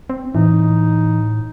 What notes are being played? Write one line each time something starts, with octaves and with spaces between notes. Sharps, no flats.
C4
A2 E3 D#4